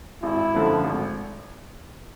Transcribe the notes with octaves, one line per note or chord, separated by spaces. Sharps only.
G#1 E4
F#2 D3 F3 A3
G#1